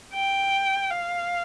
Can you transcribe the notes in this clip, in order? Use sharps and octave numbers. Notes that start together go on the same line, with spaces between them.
G5
F5